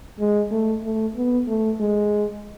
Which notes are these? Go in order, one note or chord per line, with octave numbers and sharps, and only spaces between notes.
G#3
A3
A3
B3
A3
G#3